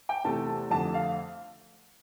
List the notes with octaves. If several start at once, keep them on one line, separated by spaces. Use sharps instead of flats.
G5
E2 C3 E3 A3 A5
F2 D3 A3 A5
F5